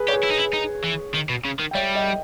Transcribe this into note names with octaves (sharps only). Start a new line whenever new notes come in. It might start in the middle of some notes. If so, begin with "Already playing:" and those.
Already playing: G#4 B4
G4 C#5
G#4 B4
E4
D#4
E4
D#4
E3
D#3
B2
C#3
D#3
G5
G3 C#5 E5
D#5 G5